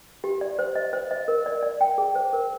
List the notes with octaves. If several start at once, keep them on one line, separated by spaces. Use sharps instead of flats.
G4
D5
C5
D#5
C5
D#5
A#4
D5
D5
G5
G#4
C5
A#4